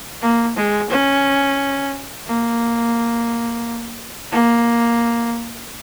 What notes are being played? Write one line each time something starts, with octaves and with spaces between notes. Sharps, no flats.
A#3
G#3
C#4
A#3
A#3